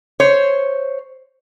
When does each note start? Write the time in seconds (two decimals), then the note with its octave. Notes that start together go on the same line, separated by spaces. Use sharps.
0.20 C5 C#5